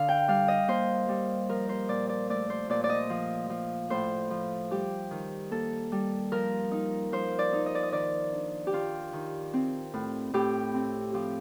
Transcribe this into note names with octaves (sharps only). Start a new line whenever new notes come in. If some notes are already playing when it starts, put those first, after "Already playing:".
Already playing: D3 F5
G5
G3 F5
D#5
A#3 C5
G3
F3 A#4
C5
A#2 D5
D5
A3 D5
C5
A#2 D5
D5
D#5
F3
F3
A2 C5
F3
G3 G4
D#3
A#3 A4
G3
F3 A#4
D#4
F3 C5
D5
D#4
D#5
D5
D#5
D#3 D5
D4
G4
D#3 F4
D#3
C4
A2
A2 G4
C4
F3 G4